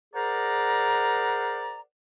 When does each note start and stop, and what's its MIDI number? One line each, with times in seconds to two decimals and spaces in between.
0.14 1.80 68
0.14 1.80 70
0.14 1.80 72
0.14 1.80 74
0.14 1.80 78
0.14 1.80 82